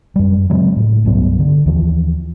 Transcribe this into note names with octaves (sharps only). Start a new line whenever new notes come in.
F#2 G3
C#3 F#3 G#3 C4
A2
C2 G2 F#3 B3
D3
D#2 E3 F3